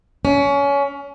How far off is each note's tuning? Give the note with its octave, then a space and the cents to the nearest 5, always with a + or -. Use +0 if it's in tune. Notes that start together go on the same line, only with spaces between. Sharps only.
C#4 +25